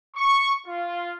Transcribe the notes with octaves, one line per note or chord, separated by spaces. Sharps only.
C#6
F4